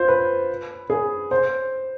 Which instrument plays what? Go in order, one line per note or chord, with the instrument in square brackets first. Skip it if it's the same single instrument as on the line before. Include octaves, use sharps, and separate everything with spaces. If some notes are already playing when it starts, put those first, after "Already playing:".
Already playing: [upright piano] F4 C5
B4
G#4
C5